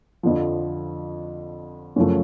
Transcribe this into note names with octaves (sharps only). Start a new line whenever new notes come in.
F2 D3 F3
F#2 C#3 F3 A3